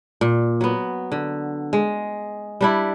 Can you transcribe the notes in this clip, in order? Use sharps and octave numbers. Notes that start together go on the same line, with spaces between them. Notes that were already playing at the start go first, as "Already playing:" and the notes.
A#2
F#3 B3
D3
G#3
G3 D4 E4